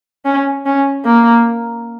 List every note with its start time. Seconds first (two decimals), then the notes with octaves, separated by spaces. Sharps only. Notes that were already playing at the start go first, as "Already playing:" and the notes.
0.25 C#4
0.66 C#4
1.05 A#3